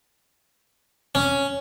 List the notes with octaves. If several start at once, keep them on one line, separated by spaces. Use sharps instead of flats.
C#4